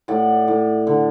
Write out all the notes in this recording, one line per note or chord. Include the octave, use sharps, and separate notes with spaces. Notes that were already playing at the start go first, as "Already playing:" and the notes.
A2 D5 F#5
A2
D3